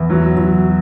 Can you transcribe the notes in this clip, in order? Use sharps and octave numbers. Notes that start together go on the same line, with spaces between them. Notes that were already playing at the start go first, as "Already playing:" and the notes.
Already playing: E2
F#3
F#3